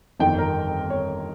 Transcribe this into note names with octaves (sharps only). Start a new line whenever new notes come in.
G1 F2 D#3 G5
A#4
C#5